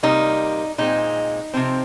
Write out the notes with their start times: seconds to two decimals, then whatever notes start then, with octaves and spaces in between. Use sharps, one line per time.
0.03 C3 G3 A#3 D#4
0.78 A#2 G#3 C4 D#4
1.54 C3 F3 C4